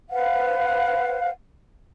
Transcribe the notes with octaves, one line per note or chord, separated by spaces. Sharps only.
B4 C5 F5 F#5